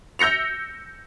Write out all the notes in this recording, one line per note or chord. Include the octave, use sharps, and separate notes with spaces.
E6 G6 A#6 C#7 F7